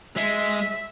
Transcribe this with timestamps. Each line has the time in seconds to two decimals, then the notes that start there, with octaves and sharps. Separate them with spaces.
0.16 G#3 E5